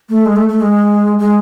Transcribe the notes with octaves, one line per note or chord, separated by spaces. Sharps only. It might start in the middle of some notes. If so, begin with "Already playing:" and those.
A3
G#3
A3
A3
G#3
G#3